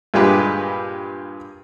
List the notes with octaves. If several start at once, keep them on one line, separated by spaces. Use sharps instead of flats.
G2 A#2 G#3 G4 B4